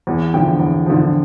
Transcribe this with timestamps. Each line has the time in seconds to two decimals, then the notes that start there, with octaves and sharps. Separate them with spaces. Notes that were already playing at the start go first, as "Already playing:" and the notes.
0.07 E2
0.34 D3 F3 G5
0.59 E2
0.86 D3 F3